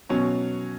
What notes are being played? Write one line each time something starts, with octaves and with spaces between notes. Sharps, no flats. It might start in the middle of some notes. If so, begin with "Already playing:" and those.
B2 F#3 C#4